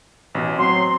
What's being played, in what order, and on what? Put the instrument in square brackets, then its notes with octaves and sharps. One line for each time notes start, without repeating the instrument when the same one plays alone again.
[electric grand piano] A1 B2
[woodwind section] F#3 C6 [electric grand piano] C4